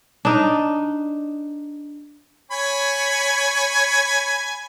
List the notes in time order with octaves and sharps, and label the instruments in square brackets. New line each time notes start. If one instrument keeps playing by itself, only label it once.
[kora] D4 D#4
[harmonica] C#5 G#5 B5